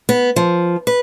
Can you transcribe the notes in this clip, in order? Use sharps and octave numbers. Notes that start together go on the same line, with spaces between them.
B3
F3
B4